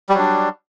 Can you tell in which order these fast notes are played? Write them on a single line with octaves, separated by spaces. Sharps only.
G3 F#3 D4